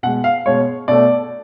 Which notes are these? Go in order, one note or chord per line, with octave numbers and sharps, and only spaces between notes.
B2 G#3 F#5
F5
B2 G#3 C#5
B2 A3 D5